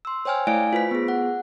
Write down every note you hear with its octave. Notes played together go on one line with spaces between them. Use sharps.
C6 E6
C5 C#5 G5 G#5 F6
A3 E4 D5 F5 G#5 D7
F4 B4 C5 B6
B3 G#4
F#5